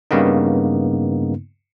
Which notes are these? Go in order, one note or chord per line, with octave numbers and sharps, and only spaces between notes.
G2 C#3 A#3 B3 D#4